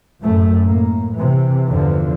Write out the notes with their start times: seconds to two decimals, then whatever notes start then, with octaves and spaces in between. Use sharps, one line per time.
0.22 F#2 A2 A3
0.63 A2 A#3
1.15 C3 E3
1.69 E2 G2 D3 E3 F3